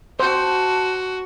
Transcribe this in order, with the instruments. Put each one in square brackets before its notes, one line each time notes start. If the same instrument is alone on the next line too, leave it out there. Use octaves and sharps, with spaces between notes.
[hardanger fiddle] F#4 [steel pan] C5 [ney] A5